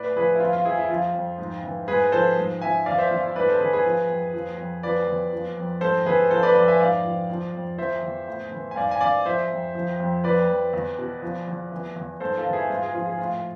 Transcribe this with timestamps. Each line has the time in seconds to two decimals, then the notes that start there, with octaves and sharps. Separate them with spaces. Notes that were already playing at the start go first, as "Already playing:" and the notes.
Already playing: A2 B4 D5
0.16 F3 G#4 B4
0.35 E4
0.40 F3 F4
0.53 F4
0.65 F2 E4 G#4
0.77 E4
0.89 F3 F4
1.15 F2
1.38 G#2
1.64 E3
1.88 G#2 G#4 B4
2.12 F3 A4 C5
2.37 G#2
2.62 F3 E5 G#5
2.86 E3 D5 F5
2.98 C5 E5
3.11 E2 F4
3.23 E4
3.36 G#2 B4 D5
3.48 A4 C5
3.60 E3 G#4 B4
3.73 G#4 B4
3.85 F3
4.09 F2
4.34 F3
4.58 F2
4.83 F3 B4 D5
5.07 E2
5.33 F3
5.57 F2
5.81 G#2 A4 C5
6.06 E3 G#4 B4
6.31 F3 A4 C5
6.43 B4 D5
6.55 F2 B4 D5
6.68 E5 G#5
6.80 G#2 D5 F5
7.04 F3
7.30 F3
7.54 F2
7.78 F3 C5 E5
8.03 E2
8.28 A2
8.52 E3
8.71 G#5
8.76 G#2 D5 F5
8.91 G#5
9.01 E3 D5 F5
9.25 F3 C5 E5
9.51 F2
9.75 F3
10.00 F2
10.24 F3 B4 D5
10.49 F2
10.73 E2
10.99 B2
11.22 F3
11.48 E2
11.72 E3
11.96 E2
12.20 G#2 A4 C5
12.38 F4 A4
12.46 E3
12.53 E4 G#4
12.70 G#2 F4
12.83 G#4
12.94 F3 F4
13.06 G#4
13.18 A2 F4